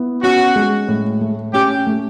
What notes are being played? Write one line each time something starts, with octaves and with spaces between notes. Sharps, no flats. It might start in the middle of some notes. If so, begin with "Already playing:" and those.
Already playing: B3 E4
C#4 F#4
G#3
A2
A3
C#4 G4
A3